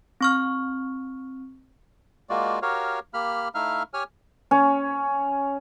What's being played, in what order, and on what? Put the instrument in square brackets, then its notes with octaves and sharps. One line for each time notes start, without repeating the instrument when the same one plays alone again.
[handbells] C4 C#6 F6
[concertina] G#3 A#3 F4 F#4 D5
F#4 G4 A#4 C#5 F5
A#3 G4 B5 F6
A3 D#4 E4 E5 F5 F6
G4 C#5 G#5 F6
[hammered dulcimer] C#4